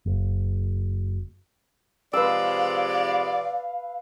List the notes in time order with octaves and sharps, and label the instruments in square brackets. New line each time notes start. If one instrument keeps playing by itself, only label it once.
[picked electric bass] F#1
[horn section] C3 F3 G#3 [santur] B4 E6 [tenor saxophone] D5 [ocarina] F5